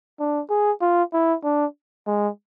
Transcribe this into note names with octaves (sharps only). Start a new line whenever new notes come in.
D4
G#4
F4
E4
D4
G#3